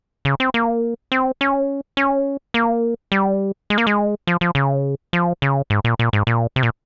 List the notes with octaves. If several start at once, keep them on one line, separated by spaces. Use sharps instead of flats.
C#3
C4
A#3
C4
C#4
C#4
A#3
G3
G#3
A#3
G#3
F3
F3
C#3
F3
C#3
G#2
A#2
A#2
G#2
A#2
C3
A#2